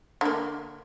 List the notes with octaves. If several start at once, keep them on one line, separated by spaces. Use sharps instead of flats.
D3 A#3